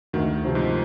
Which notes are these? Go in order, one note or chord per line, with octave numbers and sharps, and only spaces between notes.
D2 D#3
C3 F3 C4
G#2